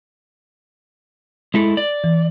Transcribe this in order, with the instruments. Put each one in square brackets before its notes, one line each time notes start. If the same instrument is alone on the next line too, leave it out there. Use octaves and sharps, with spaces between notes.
[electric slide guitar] G#3 E4 A4
D5
[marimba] E3